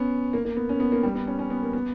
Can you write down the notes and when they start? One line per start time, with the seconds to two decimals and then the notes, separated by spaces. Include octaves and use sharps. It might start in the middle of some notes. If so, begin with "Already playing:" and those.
Already playing: B3 C#4
0.33 A#3
0.45 A#3
0.57 B3
0.69 C#4
0.80 B3
0.92 A#3
1.03 G3
1.15 B3
1.27 C#4
1.39 C#4
1.50 B3
1.63 A#3
1.73 B3